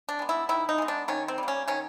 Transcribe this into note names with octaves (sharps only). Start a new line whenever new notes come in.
D4
G#3 B3
E4
D#3 E4
D#4
G#3 B3
D4
D#3 C#4
C4
G3 A#3
C#4
D#3 C#4